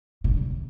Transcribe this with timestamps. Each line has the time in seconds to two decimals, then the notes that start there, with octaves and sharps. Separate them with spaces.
0.24 B2
0.31 D3
0.37 F#2